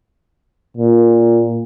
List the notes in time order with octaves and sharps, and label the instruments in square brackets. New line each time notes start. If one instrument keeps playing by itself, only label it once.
[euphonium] A#2